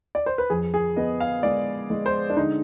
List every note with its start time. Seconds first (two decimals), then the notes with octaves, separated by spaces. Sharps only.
0.15 D5
0.26 C5
0.38 B4
0.50 F2 G#4
0.74 G#4
0.96 B3 D#5
1.20 F5
1.43 G#3 D5
1.90 G#3
2.06 C5
2.30 D4
2.37 D3 D#4